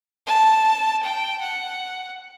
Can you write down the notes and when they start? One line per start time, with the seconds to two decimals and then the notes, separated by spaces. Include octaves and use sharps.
0.27 A5
1.03 G5
1.41 F#5